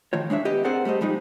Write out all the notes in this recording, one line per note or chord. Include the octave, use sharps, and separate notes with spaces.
A2 D#3 F3 C#5
G#3 D4 C#5 E5
B3 G4 D#5
C4 G#4 A#4 C5 D5 F#5
G3 A3 C5 D#5
F3 G3 G#3 D#4